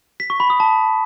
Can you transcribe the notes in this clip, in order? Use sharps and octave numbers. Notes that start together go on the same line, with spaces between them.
B6
C#6
B5
D#6
A5